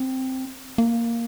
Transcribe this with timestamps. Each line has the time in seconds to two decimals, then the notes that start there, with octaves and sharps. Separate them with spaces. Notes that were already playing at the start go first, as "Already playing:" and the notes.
Already playing: C4
0.78 A#3